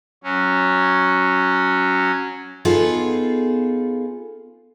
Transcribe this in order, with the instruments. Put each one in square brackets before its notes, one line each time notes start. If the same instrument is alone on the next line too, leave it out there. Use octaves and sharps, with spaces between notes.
[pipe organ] F#3 C#4
[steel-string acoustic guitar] B3 D#4 F4 G#4 A4